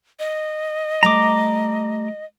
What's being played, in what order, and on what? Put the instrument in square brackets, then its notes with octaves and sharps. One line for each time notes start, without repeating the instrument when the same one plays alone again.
[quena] D#5
[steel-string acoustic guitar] G3 A3 [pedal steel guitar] A#5 D6